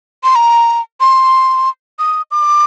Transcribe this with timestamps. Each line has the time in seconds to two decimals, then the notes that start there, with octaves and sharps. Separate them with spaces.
0.24 C6
0.35 A#5
1.00 C6
1.99 D#6
2.31 D6